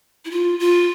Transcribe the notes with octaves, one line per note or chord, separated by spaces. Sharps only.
E4
F4
F4